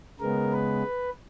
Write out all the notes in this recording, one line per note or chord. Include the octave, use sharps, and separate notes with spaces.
C#3 G#3 B3 A#4
B4